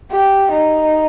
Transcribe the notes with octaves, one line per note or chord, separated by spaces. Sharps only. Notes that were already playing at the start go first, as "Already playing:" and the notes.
G4
D#4